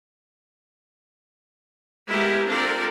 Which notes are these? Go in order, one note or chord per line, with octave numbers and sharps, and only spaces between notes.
G#3 B3 E4 G4 A#4
C4 D4 F4 A4 A#4 D5